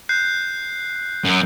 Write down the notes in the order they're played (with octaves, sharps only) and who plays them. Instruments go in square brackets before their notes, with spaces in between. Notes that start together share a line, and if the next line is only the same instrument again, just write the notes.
[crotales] F#6 G6 C7
[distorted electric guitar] F#2